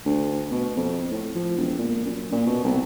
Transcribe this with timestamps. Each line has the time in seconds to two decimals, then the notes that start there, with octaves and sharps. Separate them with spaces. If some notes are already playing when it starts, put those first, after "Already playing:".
0.06 D2
0.51 B2
0.77 F2
1.11 A2
1.35 F3
1.58 E1
1.79 A#2
2.05 F#2
2.32 A#2
2.47 B2
2.64 C2